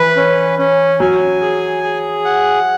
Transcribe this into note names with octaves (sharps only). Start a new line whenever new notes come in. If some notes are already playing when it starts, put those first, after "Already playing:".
Already playing: E3 B4
C#4
C#4
F#3 G#5
G#4
G#4
F#5